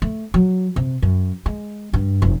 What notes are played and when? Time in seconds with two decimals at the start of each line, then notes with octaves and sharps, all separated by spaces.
0.02 A3
0.34 F#3
0.76 C3
1.02 F#2
1.46 G#3
1.93 G2
2.22 F1